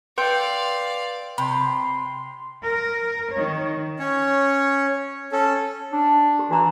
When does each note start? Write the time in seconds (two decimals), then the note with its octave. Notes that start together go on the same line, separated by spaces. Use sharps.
0.18 B4 D5 F5 G5 C6
1.38 C3 B5 C6
2.63 A#4
3.32 D#3 C#5
3.99 C#4 C#5
5.32 C#4 A4
5.93 D4
6.39 G4
6.51 E3 F#4 A#5 B5